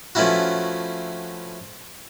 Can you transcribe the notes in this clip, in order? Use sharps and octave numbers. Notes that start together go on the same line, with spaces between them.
F3 A3 B3 C#4 E4 F#4